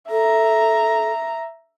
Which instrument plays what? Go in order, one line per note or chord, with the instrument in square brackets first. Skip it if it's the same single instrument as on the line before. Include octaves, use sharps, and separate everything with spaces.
[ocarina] A4 [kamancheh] E5 A#5